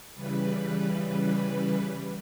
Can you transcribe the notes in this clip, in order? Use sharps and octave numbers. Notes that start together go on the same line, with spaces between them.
C#3 E3 G3 B4